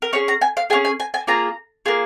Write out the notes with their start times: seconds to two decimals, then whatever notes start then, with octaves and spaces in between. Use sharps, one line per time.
0.02 A#4
0.13 C#4 G#4 C#5
0.28 A#5
0.41 G#5
0.57 F5
0.70 C#4 F4 G#4 G#5
0.85 G#5
1.00 G#5
1.14 G#5
1.27 A#3 F4 G#4 A#5
1.86 A#3 F4 G#4